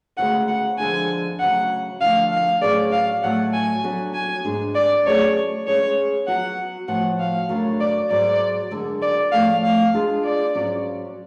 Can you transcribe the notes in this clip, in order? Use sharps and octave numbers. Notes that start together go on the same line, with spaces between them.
D2 C#3 G#3 B3 F#5
F#5
F2 D3 G#3 D4 G#5
D2 C#3 F#3 F#5
D3 F3 A3 F4 F5
F5
A2 F#3 C#4 G#4 B4 D5
F5
A2 F#3 A3 F#5
G#5
F#3 B3 D4 F#4 A4
G#5
G#2 G#3 D4
D5
F#3 A3 C#4 G#4 B4 C#5
G#3 C#4 G#4 B4 C#5
F#3 B3 F#4 F#5
A2 F3 B3 F#4 F#5
F5
F#2 C#3 F#3 A3 D4
D5
G#2 F#3 B3 D5
F#2 D3 G#3
D5
A2 F3 A3 F5
F5
G#3 B3 D4 F4 G#4
D5
G#2 F#3 C#4 F4